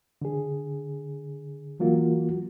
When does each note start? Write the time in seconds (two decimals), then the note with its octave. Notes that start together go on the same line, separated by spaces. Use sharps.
0.22 D3 G#4
1.80 E3 F#3 A#3 F4 F#4